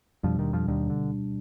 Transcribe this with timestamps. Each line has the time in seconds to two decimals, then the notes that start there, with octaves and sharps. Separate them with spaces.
0.24 F2 B2 F3 G3 D4
0.39 D#2 D#3
0.53 F2 F3
0.68 D#2 B2 D#3 G3 D4
0.90 D3